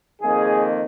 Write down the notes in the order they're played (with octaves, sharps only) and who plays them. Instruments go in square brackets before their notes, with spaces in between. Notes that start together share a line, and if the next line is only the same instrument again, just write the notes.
[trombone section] F2 D#3 A#3 G#4